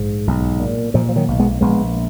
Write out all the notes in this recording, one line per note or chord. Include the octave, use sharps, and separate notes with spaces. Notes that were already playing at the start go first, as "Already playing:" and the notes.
Already playing: A#1 G#2
B1
A#2
A#2 F3
F3
D#3 F#3
B1
G#3 B3
A#1 G#3 B3